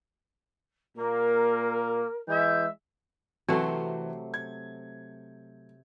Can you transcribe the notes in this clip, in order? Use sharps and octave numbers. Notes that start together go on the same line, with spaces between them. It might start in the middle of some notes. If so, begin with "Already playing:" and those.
A#2 A#3 A#4
E3 G#3 E5 G6
C3 E3 F#3 A3 C4 A4 C5
G#6